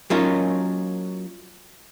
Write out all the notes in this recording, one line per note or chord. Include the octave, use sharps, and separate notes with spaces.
F#3 A#3 C#4 D#4 F4 A#4